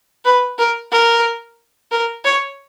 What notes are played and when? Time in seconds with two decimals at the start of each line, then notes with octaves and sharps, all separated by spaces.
0.25 B4
0.59 A#4
0.92 A#4
1.91 A#4
2.24 C#5